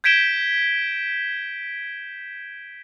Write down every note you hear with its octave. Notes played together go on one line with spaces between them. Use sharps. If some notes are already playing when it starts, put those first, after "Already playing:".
G6 G#6 B6 D7 E7 G7